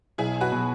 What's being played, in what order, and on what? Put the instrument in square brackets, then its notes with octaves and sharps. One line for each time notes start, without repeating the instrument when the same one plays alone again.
[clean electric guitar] B1 [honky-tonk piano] E4 G#4
[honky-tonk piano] F#4 B4
[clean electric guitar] B2 F#3